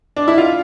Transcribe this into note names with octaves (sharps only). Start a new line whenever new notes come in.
D4
E4
F4